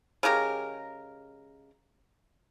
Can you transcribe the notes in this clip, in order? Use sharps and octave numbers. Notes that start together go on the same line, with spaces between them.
C#3 G#3 G4 A#4